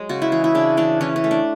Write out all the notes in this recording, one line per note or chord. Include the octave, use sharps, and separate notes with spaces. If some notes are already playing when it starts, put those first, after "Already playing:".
Already playing: F#3 G#3
C#3 F#4
E4
E3 G#4
E4
C#3 D4
E3 D4
E3 C#4
C#4
A3
D4